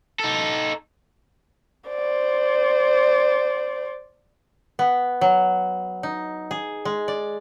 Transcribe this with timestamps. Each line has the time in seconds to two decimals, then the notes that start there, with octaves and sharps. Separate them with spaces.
0.20 D#4 A4
1.89 C5 D5
4.79 B3
5.21 F#3
6.03 D#4
6.51 G#4
6.85 G#3
7.08 D5